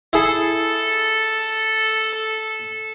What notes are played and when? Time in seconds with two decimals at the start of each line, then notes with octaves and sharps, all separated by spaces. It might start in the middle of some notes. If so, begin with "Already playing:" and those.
0.13 E4 G#4 A4